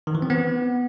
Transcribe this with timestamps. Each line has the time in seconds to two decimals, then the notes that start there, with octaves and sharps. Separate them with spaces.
0.07 D#3
0.15 E3
0.22 C4
0.30 B3